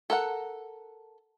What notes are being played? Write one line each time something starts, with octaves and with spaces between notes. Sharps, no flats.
A4 A#4 F#5